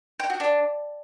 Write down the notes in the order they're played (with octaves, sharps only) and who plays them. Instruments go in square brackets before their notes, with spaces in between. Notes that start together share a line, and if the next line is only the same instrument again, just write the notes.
[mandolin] G5
F#4
D4